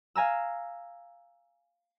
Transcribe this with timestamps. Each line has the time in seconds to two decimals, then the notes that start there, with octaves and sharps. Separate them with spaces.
0.16 F5 G#5 A#5 E6